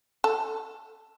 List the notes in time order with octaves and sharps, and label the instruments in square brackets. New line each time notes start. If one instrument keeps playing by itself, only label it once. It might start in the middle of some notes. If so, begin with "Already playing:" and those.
[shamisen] A4